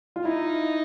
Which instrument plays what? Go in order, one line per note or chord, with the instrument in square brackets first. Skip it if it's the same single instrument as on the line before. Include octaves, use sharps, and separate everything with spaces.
[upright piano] F4
[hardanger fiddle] D#4 [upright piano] E4